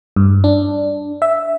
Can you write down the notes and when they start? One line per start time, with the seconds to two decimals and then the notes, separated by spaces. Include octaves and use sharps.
0.16 G2
0.44 D4
1.22 E5